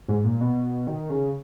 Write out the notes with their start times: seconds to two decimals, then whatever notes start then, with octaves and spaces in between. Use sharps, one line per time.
0.08 G#2
0.24 A#2
0.41 B2
0.87 D#3
1.10 C#3